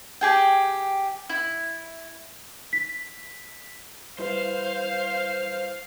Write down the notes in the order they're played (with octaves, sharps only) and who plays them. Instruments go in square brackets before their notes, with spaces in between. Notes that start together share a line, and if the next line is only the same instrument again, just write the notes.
[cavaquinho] G4 G#4 G5
E4
[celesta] B6
[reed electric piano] G3 E4 B4 [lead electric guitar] C5 [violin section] F5